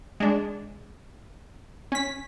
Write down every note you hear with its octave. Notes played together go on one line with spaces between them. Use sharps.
G#3 D4
C#4 B6